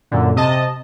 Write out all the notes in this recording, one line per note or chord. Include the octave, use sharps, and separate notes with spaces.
F#2 A#2 D3
C3 D#5 A5